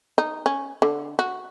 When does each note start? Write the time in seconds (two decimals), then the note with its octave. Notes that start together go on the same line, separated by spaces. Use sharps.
0.18 D#4
0.46 C#4
0.82 D3
1.19 F#4